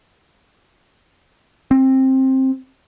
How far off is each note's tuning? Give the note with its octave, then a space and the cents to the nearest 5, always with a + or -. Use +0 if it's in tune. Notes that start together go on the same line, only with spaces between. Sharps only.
C4 +15